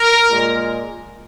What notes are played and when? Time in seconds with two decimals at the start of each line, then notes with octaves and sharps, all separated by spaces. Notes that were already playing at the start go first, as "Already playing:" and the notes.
Already playing: A#4
0.31 A#2 G#3